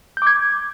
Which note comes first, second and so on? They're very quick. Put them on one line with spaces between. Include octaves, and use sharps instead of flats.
G6 D6 G#6